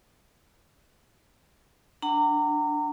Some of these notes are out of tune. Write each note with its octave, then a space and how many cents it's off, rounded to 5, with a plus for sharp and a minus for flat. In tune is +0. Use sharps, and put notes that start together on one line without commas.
D4 +0 F#5 +35 A#5 -30